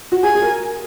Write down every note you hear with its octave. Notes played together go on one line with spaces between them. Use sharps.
F#4
G#4 G#5
G#4
A#4